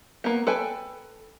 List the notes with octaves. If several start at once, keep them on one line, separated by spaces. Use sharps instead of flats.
A#3 B3
A4 B4 G5 G#5